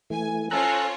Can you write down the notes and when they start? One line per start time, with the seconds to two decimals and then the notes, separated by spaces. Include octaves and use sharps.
0.10 E3 A3 G#5
0.51 C#4 F4 A4 C5 C#5 A#5 F#6